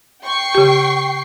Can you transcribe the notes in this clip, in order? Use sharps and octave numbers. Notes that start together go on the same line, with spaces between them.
G5 C#6 C7
C#3 G4